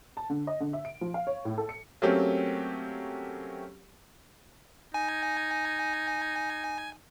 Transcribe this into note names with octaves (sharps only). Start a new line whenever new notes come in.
A5
D3
D#5
D3
E5
D7
F3
F5
C#5
A2
A4
C#7
F#3 A3 A#3 C4 C#4 G4
D#4 G#5